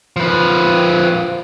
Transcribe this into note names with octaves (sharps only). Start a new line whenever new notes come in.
F3 B4